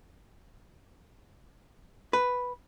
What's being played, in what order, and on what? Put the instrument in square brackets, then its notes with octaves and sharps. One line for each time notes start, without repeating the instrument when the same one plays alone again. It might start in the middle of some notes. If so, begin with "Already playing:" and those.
[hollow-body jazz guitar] B4